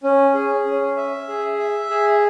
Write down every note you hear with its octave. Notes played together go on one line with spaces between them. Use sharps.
C#4
G#4
C#4
E5
G#4
E5
G#4